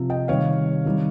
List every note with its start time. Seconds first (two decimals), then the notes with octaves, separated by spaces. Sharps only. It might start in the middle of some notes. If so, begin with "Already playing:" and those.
Already playing: C3 F3
0.10 D#5 G5
0.28 C3 D#3 G3 C#5 F5
0.85 C3 D#3 G3